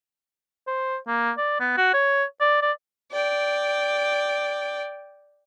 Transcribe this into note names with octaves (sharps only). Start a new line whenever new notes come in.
C5
A#3
D5
B3
F#4
C#5
D5
D5
D5 G5